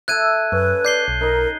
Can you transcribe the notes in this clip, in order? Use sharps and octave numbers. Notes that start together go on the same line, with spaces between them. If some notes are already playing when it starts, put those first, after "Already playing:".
A4 E5 F#6 G#6 D#7
F#2 C#4 B4
D5 G6 C7 G7
B1
D#4 A#4 D#5